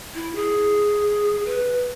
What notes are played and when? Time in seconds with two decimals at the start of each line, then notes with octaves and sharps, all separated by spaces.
0.15 E4
0.35 G#4
1.45 B4